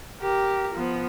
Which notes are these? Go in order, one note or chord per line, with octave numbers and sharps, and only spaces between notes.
G4 A#4
F3 B3